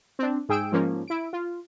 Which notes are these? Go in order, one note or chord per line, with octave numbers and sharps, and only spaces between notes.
C4 D4
G#2 G#4 G5 E6 D7
G#2 F3 A#3 C#4
E4 D7
F4